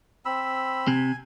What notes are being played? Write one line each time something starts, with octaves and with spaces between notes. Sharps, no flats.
C4 B5 E6
C3 G#5